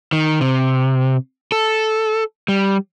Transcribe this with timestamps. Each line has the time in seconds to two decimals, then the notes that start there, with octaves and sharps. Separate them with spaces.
0.12 D#3
0.41 C3
1.52 A4
2.48 G3